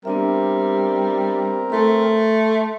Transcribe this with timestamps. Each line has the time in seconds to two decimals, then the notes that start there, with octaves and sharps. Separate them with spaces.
0.05 G3 B3 C4 D4 A#4 E5
1.72 A3 C6